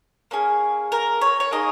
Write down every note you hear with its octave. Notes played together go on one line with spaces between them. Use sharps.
A#3 C#4 G#4
A#4
C#5
C#5
A#3 D#4 G#4 D#5